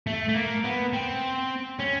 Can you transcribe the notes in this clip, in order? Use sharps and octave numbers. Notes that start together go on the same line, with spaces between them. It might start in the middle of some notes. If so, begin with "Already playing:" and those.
A3
A3
A#3
B3
C4
C#4